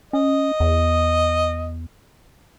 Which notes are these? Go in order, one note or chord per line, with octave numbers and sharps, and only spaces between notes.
C#4 D#5
E2